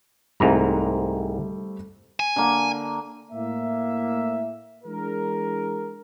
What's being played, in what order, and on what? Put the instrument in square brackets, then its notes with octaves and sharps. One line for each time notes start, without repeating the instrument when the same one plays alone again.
[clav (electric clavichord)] C2 G#2 A#5 [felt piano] G3 A3 C4
[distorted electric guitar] G#5
[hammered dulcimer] D3 A#3
[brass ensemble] A2 A#3 E5
E3 G#3 D4 G#4 A#4